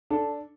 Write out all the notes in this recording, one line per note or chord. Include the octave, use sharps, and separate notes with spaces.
D4 A4